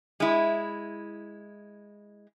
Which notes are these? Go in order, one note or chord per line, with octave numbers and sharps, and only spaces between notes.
G#3 E4